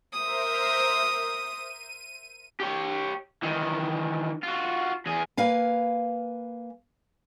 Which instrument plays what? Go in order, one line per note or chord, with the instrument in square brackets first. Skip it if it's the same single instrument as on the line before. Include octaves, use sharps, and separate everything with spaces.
[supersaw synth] A#4 C5 E5 [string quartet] D#6
[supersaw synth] D#7
[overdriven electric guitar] G4 C#5
D#3 E3
F4 F#4
E2 G#4
[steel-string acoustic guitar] A#3 B4 F5 G#5